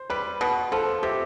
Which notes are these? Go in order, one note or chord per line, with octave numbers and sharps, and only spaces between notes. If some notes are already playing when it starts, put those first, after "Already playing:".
Already playing: C5
G3 B4
B2 B4
F3 A4
C3 G4